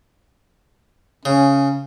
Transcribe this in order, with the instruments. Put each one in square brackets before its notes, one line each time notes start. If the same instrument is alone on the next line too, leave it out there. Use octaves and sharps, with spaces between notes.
[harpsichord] C#3 [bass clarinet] C#4